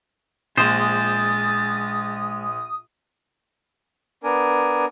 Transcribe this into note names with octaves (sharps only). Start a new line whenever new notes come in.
A#1 G#3 C5 D#6 A6
B3 D4 A#4 G#5